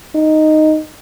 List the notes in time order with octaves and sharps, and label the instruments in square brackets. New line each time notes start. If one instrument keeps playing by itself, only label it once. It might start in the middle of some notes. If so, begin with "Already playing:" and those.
[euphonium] D#4